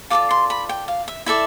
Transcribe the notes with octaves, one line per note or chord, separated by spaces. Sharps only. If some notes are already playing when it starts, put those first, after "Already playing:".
F4 A4 D5 D6
C6
B5
G5
F5
E5
E4 A4 D5 E5